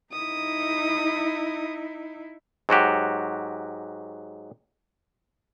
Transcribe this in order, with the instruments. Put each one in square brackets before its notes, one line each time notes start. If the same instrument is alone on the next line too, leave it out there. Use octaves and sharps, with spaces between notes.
[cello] D#4 E4 [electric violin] D#6
[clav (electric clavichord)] G#2 F#3 F#4 G4